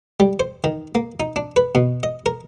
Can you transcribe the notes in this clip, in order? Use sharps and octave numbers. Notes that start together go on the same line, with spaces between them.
G3
C5
D#3
A#3
D#4
D4
B4
B2
D#5
A#4